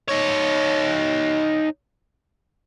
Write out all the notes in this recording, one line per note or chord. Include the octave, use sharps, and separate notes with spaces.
D#4 C#5